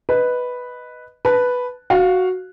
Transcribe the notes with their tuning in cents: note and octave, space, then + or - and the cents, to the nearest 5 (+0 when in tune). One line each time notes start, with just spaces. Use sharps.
B4 +0 D#5 +0
B4 +0 A5 +0
F#4 +0 F5 +10